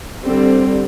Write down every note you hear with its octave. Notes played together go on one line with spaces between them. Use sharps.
D3 G3 C4